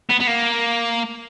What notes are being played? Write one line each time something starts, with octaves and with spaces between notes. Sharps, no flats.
B3
B3
A#3